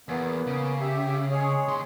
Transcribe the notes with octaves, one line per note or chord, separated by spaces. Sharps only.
E2 A#3 B3
C#3
G4 E5
G#3 G#4 C#5
D#2 C6